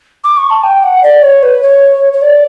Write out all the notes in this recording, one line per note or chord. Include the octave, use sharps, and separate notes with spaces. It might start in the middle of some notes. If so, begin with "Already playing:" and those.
D6
C#6
A5
G5
F#5
D5
C#5
B4
C#5
C#5
D5